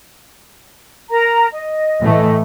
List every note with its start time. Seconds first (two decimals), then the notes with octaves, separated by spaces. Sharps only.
1.11 A#4 A#5
1.52 D#5
2.01 A2 E3 A3